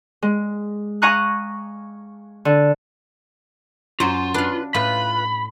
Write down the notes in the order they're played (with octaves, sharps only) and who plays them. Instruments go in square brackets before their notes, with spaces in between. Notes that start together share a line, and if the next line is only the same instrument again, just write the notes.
[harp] G#3
F5 G#5 A#5 C#6 D#6 F#6
D3
[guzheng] F#2 F#3 [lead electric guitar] F4 [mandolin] C5
[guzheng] D4 F5 [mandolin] B4
[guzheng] A2 [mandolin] F4 B4 [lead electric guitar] B5